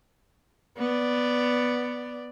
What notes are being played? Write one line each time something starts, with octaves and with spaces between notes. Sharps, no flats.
B3 D5